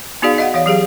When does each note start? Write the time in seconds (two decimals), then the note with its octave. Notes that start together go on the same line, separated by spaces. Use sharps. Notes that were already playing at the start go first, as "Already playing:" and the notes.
0.22 B3 D#4 F#4 G#4 D5 F5
0.38 D#5 F5 F#5
0.54 E3 C#5 F5
0.66 F#3 G4 G#4 F5